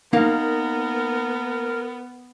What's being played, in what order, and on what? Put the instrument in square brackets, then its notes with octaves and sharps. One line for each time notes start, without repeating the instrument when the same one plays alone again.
[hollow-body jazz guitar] A#3 D#4 F5 [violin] B3 [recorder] A#4